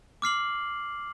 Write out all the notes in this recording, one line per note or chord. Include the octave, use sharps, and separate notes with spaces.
D6 F6 C7 F#7